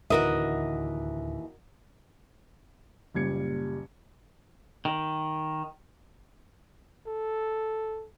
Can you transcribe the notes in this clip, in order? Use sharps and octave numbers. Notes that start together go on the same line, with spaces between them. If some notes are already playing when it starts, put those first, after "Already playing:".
D1 D#2 D3 E3 F#4 A#4 D#5 E5
F#1 A#2 G3 G#6 C#7
D#3
A4